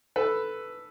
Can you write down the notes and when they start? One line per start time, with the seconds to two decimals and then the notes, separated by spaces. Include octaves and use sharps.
0.16 A4 B4